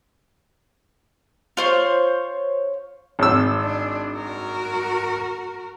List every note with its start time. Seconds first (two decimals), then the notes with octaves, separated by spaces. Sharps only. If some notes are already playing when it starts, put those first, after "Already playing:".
1.57 F4 C5 C#5
3.19 G#1 E6
3.61 D4
4.15 F#4 A#4